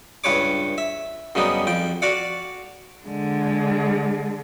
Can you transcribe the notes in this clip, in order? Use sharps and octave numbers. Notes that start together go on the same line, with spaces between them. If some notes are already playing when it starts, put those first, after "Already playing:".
C#2 G2 B4 C#5 D6
E5
F#2 C#3 G3 B3 D#4
F2 G5
F#4 D5 F5 F#5
D3 G#3